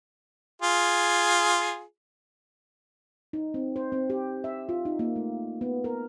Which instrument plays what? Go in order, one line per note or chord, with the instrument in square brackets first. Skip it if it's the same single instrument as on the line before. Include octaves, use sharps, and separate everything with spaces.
[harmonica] F4 G#4
[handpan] D#4
C4
C5
C4
G4
E5
F4
D#4
A#3
A3
B3
A#4